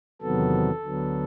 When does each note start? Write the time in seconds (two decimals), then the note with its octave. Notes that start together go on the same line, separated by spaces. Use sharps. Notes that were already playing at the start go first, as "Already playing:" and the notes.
0.22 E2 C3 D#3 F#3 B3 A4
0.83 D2 D3 F#3 B3